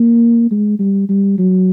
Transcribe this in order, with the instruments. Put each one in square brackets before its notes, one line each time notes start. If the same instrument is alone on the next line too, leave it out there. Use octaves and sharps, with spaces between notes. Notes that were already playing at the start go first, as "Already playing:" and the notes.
Already playing: [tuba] A#3
G#3
G3
G3
F#3